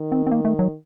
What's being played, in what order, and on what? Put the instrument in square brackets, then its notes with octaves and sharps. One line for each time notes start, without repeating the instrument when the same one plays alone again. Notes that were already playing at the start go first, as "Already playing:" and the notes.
Already playing: [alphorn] D#3
[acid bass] C4
C4
A#3
A3
F#3